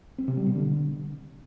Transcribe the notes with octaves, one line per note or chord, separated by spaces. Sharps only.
C4
C3
G3
B2
D3